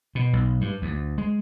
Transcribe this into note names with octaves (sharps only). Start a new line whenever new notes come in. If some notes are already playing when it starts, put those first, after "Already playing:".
B2
B1
G2
D2
G#3